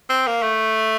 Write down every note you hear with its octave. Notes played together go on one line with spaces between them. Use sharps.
C4
A#3
A3